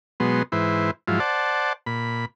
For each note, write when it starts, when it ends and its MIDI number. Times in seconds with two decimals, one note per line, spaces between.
0.20 0.43 47
0.20 0.43 54
0.20 0.43 56
0.20 0.43 59
0.20 0.43 84
0.52 0.91 44
0.52 0.91 52
0.52 0.91 64
0.52 0.91 71
0.52 0.91 72
1.08 1.19 44
1.08 1.19 53
1.08 1.19 54
1.08 1.19 64
1.08 1.19 65
1.20 1.73 72
1.20 1.73 74
1.20 1.73 78
1.20 1.73 81
1.86 2.25 46
1.86 2.25 83